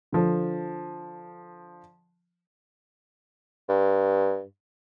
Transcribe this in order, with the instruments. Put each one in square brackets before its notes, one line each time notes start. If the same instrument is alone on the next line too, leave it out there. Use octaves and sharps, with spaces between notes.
[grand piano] D3 F3
[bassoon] G2